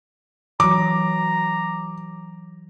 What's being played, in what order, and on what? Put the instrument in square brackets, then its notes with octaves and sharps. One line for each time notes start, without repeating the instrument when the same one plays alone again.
[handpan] E3 F#3 [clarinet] A#5 [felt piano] D6